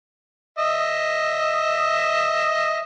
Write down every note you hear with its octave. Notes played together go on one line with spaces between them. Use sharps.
D#5 E5